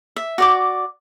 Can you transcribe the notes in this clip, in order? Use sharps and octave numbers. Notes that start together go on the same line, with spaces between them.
E5
F#4 D5 D6